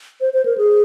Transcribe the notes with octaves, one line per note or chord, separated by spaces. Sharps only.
C5
C5
A#4
G#4